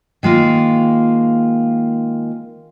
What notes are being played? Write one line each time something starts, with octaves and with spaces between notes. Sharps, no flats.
D#3 G#3 A#3 F4